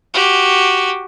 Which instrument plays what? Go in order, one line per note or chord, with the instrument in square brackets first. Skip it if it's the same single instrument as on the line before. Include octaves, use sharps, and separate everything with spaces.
[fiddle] F#4 G4